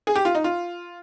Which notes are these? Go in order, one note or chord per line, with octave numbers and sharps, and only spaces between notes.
G#4
G4
F4
D#4
F4